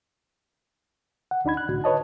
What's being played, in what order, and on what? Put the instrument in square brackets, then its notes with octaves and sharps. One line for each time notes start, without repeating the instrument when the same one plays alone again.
[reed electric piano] F#5
D2 D4 D#4 B5 G#6
F#6
C2 A2 D3 F#4
B4 C#5 D#5 A5